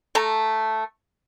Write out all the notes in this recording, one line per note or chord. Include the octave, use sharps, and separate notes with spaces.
A3 A4 A#5